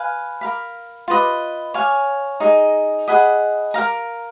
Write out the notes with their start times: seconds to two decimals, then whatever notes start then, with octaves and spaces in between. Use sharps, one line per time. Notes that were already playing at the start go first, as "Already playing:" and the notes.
Already playing: B4 F5 G#5
0.41 A#4 F5 B5
1.08 F4 B4 D#5
1.74 C#5 F5 G#5
2.40 D#4 G#4 D#5 A#5
3.08 G#4 D#5 F#5 B5
3.74 A#4 F5 A#5